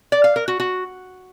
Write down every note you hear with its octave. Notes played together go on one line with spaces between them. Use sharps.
D5
F5
A#4
F#4
F#4